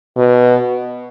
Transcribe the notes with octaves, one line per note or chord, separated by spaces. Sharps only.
B2